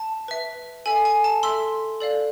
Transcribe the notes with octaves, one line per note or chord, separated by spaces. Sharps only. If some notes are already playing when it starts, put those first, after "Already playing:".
Already playing: A5
B4 E5
A4 E5 G#5
G#5
A5
A4 E5 C6 E6
A4 D5 F5